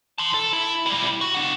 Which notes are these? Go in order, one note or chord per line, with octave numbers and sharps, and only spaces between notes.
A5 C6
A4
E4
G3 E4
F#4
G4 F#5